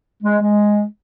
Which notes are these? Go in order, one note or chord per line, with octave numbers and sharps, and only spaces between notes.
G#3
G#3